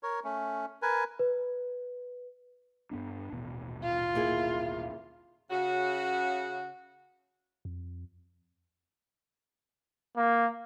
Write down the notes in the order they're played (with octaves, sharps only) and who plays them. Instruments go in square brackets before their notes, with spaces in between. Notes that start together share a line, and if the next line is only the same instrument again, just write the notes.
[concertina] A#4 C#5
A3 C#4
A#4 B4 G#5
[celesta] B4
[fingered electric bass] G2 B3 D4
D#1 A1 B2
[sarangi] F4
[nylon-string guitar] A#3 E4 G#4
[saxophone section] C#3 F#4
[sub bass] F2
[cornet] A#3